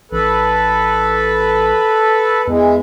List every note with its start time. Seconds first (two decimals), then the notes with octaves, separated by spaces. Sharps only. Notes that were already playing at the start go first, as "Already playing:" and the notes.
0.12 A1 A4 B4
2.47 E2 E3 G#3